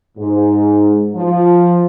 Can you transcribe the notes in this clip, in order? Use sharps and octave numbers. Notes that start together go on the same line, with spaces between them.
G#2
F3